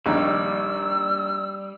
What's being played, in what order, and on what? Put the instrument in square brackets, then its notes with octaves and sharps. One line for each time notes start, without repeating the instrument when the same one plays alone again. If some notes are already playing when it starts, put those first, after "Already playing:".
[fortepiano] A#1 D#2 D#4 [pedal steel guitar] G3 [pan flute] E6